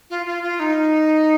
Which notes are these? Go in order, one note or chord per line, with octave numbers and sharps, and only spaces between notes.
F4
F4
F4
D#4